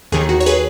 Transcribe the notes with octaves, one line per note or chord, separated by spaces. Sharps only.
D#2 D#3 G#4
F#4
C#5
G#4 B4